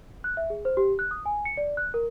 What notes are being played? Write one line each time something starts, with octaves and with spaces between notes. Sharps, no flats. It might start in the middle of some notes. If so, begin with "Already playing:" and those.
F#6
E5
G#4
C5
G4
F#6
D#6
G#5
C#7
D5
F#6
A#4